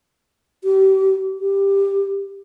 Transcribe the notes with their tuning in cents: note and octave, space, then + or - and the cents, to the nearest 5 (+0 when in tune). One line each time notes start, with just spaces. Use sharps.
G4 -30
G4 +10